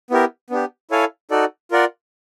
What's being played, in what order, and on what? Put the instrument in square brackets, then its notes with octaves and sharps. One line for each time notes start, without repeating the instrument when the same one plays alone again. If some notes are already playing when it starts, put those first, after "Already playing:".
[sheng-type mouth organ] B3 E4 G4 A#4
B3 D4 G4
E4 A4 C#5 F5 G#5
D#4 F#4 A4 D5
F4 A#4 D5 F#5